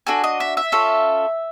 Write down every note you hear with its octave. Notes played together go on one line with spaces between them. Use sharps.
D4 F#4 A4 G#5
D#5
E5
E5
C#4 F4 A4